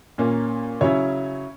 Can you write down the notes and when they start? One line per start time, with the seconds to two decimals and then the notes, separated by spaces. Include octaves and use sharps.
0.18 A#2 A#3 C#4
0.81 C#3 F#3 C#4 E4 C#5